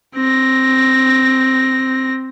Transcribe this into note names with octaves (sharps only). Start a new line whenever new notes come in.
C4 A#6